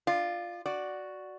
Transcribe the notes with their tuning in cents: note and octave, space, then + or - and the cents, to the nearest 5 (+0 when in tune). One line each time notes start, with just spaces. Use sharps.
F4 +0 D5 +30
F#4 +0 D5 +0